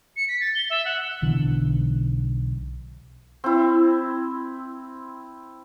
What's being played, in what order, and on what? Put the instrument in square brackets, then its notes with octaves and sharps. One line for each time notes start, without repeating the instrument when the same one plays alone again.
[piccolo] C#7
B6
A6
G7
E5
F#5
[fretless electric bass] B1 D3 E3
[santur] C4 E4